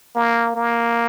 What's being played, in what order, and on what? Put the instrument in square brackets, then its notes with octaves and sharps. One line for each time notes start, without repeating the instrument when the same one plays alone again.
[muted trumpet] A#3
A#3